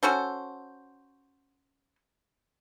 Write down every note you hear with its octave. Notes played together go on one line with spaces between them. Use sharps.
C#4 F#4 A4 C5